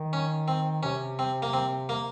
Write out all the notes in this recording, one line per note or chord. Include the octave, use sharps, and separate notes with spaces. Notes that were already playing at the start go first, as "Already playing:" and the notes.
Already playing: D#3
C#4
C4
C3 C#4
C4
A#3
C4
A#3